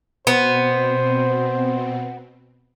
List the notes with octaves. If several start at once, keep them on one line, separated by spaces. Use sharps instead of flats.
B2 B3 C4 C5